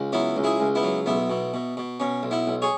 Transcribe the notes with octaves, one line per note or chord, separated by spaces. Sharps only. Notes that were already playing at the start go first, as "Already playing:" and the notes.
Already playing: C#2
F#3 B3 E4
C#2
E4 G#4
C#2
B3 E4
F#3
B1 B3 E4
B2
B2
B2
B2 C#4
B1
B3 E4
B1
G#4 C#5